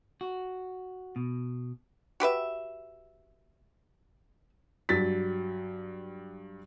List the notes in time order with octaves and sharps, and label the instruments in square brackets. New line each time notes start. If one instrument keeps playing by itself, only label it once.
[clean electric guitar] F#4
B2
[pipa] F#4 G4 B4 E5
[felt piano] G2 F#3 A6 B6